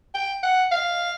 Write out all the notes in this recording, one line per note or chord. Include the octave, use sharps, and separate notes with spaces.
G5
F#5
F5